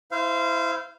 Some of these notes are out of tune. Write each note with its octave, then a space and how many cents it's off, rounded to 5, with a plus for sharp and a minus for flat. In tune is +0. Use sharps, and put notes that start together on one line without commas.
E4 -5 C5 -20 F5 -25